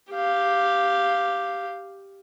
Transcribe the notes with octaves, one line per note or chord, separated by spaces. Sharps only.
G4 F5